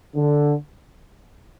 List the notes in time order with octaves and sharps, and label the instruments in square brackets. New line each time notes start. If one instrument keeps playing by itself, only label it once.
[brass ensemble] D3